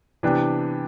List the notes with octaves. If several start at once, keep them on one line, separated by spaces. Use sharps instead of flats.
C3 E3 B3 D4 G4